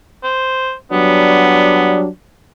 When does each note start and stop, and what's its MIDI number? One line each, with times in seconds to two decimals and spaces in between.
0.24 0.74 72
0.92 2.07 54
0.92 2.07 55
0.92 1.99 59
0.92 2.07 62